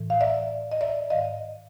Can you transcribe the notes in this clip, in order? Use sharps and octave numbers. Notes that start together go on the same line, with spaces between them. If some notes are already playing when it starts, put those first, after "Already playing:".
Already playing: A2 E3
F5
D5 E5
D#5
D5 E5
G#2 D#3 D#5 F5